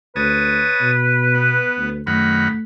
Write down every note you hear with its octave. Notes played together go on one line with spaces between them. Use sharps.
D2 B4 C#5 A5 D#6
B2
B3
D2
F#2 D#3 A3 F#5 B5